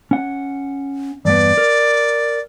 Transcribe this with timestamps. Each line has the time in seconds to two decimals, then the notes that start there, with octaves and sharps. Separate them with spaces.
0.11 C#4 F#5
1.25 E2 G2 B3 D5
1.58 A#4